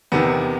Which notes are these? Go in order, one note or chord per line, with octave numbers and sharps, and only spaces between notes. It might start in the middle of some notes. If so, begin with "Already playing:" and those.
E2 C3 D#3 B3